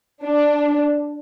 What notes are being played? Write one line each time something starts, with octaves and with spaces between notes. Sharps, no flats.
D4